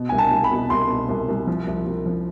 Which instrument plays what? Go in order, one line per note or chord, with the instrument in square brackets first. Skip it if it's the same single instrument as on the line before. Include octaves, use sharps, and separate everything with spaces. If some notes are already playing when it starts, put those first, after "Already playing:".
Already playing: [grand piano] B2
C2 G#5
A5
C2
B5
B2
C2 C6
B2
C2
C2
F3
C2
C2
F3